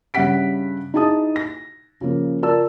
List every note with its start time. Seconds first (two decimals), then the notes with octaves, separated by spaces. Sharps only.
0.14 G2 C#3 E5 F#5 B6 D7
0.94 D#4 E4 G#4 A5 D#6
1.36 A#6
2.01 C#3 F3 A#3
2.43 F4 A#4 D5 A5 E6